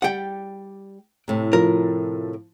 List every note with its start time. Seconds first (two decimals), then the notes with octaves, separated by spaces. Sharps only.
0.02 G3 G4 D5 F#5 G5
1.28 A2 C3
1.53 F3 A#4